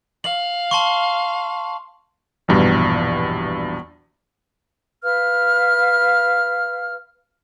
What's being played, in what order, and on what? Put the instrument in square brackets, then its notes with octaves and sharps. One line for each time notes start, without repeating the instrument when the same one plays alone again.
[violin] F5 [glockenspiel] F#7
[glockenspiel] A5 C6 C#6
[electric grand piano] A#1 E2 G2 B2
[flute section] B4 F5 F6